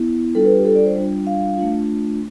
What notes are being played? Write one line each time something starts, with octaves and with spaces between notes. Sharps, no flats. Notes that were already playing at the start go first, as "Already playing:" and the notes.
Already playing: B3 E4
G3 D4 F4 A4
B4
G4
A4
D5
C5
G3 D4 F4
F5
A3 D4 F4